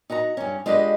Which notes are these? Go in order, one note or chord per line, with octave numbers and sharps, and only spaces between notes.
D#4 F#4 F#5 A#5
G2 C#4
G#3 D4 F4 G4 B4 D#5